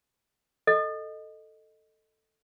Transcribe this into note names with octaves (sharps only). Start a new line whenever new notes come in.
A4 D#5